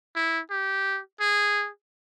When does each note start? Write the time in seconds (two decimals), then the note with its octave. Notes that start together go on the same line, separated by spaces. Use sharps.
0.16 E4
0.51 G4
1.20 G#4